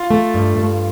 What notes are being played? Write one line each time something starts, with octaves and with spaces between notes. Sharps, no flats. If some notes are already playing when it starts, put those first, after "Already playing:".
Already playing: F4
A3
G2
G2